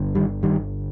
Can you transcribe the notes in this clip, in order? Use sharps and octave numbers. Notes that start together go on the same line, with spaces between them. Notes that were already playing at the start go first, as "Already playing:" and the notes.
Already playing: G1 D3
D#3 G3
D#3 G3